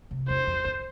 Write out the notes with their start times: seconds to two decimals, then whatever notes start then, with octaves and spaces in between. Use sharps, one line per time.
0.11 C3
0.29 E2 C5
0.47 F2
0.65 F2